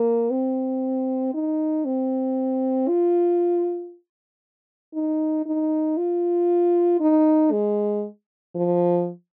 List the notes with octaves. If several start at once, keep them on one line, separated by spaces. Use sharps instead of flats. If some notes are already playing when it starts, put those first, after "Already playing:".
Already playing: A#3
C4
D#4
C4
F4
D#4
D#4
F4
D#4
G#3
F3